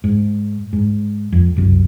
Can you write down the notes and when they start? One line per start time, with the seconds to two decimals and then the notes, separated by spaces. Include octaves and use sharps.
0.04 G#2
0.73 G#2
1.33 F2
1.55 G1 C2 F#2